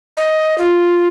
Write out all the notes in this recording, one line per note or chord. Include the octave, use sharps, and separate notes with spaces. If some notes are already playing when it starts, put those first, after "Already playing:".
D#5
F4